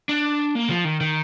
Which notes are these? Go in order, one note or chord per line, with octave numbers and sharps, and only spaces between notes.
D4
A#3
F3
D#3
D#3